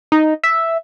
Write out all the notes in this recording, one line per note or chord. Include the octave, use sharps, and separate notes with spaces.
D#4
E5